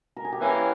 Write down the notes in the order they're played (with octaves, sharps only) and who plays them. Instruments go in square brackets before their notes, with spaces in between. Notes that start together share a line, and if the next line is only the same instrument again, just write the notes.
[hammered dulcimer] A#4
G#4
G4
[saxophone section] E3 A#3 C#4 [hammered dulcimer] E4